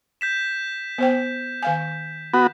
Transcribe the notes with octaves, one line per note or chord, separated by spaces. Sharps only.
G6 B6 E7
B3 C5 G5
D#3 F5 G#5
B3 F#4